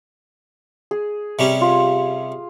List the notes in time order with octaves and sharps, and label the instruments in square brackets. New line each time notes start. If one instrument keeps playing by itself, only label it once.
[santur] G#4
[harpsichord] C3 G3 C#4
[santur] F4